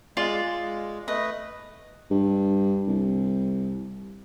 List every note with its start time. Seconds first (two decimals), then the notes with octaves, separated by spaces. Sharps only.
0.17 G#3 F4 D5 F5
0.44 G#3
1.08 A3 B4 D#5
2.10 G2
2.87 C2